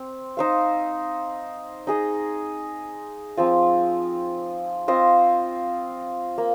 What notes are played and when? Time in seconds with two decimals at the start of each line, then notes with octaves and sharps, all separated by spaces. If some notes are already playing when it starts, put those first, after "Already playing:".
Already playing: C4
0.37 D#4 C5 F5
1.87 D#4 G#4 D#5
3.37 F3 C4 F4
4.88 C4 F4 C5 D#5
6.38 A#3